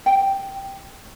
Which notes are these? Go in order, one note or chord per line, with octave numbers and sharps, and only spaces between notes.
G5